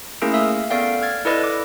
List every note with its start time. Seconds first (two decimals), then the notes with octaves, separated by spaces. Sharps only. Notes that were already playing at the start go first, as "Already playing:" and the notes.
0.22 A3 A#3 C#4 E4 G#4 A#4
0.34 E5 F5 D#6 E6
0.70 B3 A4 D5 F5 G5
1.02 F6 G#6 A6
1.25 E4 A4 B4 D5 D#5 B5
1.44 D6